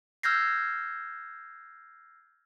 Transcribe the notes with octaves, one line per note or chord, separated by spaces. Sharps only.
E6 F6 G6 G#6 A#6 C7